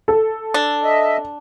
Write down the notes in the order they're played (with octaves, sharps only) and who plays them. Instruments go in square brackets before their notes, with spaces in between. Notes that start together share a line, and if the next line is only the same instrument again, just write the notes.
[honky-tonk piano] A4
[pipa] D4
[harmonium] D#5 E5